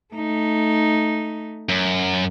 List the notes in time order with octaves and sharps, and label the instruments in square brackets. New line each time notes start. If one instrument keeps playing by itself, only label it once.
[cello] A3 D#4
[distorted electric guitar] F#2